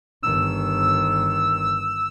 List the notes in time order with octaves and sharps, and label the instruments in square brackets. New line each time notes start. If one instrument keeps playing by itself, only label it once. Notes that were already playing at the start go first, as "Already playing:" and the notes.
[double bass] G1 D#3 [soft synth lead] E6